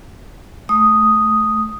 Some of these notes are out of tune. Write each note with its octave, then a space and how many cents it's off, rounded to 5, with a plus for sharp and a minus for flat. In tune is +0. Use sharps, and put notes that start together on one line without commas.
A3 -10 D#6 +0